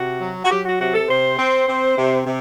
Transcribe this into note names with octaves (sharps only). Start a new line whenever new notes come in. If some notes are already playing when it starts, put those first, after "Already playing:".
Already playing: C3 F#4
F#3
F#4
F#3 G4
F#4
C3 F#4
A4
C3 C5
C4
C4
C3
C3